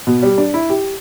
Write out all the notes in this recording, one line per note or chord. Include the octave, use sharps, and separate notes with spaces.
B2
G3
D4
E4
G4